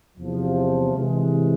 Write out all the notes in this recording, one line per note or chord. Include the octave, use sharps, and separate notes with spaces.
E2 C3 F3
C3 E3 G#3